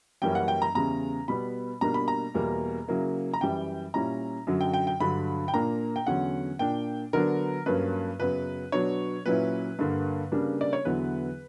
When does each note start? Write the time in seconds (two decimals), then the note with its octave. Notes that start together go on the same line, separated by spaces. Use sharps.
0.22 F#2 E3 G3 A#3 C#4 G5
0.35 F#5
0.48 G5
0.62 A#5
0.75 E2 C#3 G3 A#5
1.28 B2 G3 B3 B5
1.81 B2 G3 A#3 D4 A#5
1.94 B5
2.08 A#5
2.34 E2 B2 G3 A#3
2.88 C#3 F#3 A#3 E4
3.34 A#5
3.41 F#2 E3 G3 G5
3.94 A#2 G3 C#4 E4 A#5
4.47 F#2 D3 F#3
4.61 G5
4.74 G5
4.87 G5
5.00 G2 D3 F#3 B5
5.48 G5
5.53 A#2 A#3 D4 A#5
5.96 G5
6.07 E2 D3 F#3 C#4 F#5
6.59 A#2 A#3 D4 G5
7.13 D3 F#3 B3 D4 A#4
7.66 G2 F#3 A#3 C#4 B4
8.19 F#2 C#3 F#3 B3 B4
8.72 B2 F#3 B3 D4 C#5
9.26 A#2 F#3 C#4 E4 B4
9.79 G2 D3 A#3
10.32 C#3 G3 A#3 D4
10.61 D5
10.73 C#5
10.85 E2 D3 F#3 B3 E4 B4